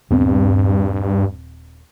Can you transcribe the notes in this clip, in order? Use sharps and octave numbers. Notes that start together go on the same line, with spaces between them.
D#1 G2 B3 C4